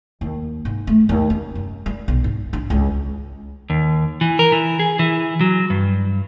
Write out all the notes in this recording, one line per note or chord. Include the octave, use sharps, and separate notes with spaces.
D#2
G#2
A3
D#2
C#4
F#2
G3
B1
G#2
D4
C#2
D#2
E3
A#4
E3
G#4
E3
F#3
G2